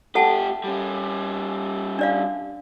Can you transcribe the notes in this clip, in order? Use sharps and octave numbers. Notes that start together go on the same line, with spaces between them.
A3 G4 A4 F#5 A5
G3 C#4
D4 D5 F5